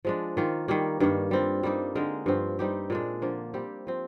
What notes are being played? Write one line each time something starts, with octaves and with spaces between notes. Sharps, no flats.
F3 G#3 D4
D#3 A#3 F4
D#3 G3 A#3
G2 D#3 G3 A#3
G3 C4 F4
G3 A#3 D#4
D3 G#3 D#4 A#4
G2 F3 C4
G3 C4 D#4 G4
A#2 G#3 D4
D3 F3 A#3
G3 C4 G4
F3 C4